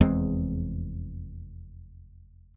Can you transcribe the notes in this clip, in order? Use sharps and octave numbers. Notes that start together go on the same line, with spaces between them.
F1 E2 G#3 C4